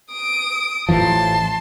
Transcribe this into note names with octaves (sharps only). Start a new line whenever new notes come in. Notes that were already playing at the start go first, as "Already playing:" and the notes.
D#6 D7
A1 E3 F3 A5 C6